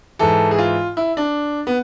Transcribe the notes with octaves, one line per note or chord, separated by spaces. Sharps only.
G#2 E3 A4
G#4
F4
E4
D4
B3